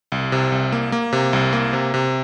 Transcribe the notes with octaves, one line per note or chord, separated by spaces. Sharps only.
C2
C3
C2
A#3
A#3
C3
C2
A#3
C3
C3